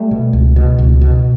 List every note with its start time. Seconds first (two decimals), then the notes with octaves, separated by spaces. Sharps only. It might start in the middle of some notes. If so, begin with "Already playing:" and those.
Already playing: G3 A3
0.11 B2
0.33 C#2
0.56 B2
0.79 C#2
1.01 B2